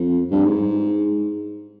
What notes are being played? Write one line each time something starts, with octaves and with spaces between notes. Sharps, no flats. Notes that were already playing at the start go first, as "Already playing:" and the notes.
Already playing: F2
G2
G#2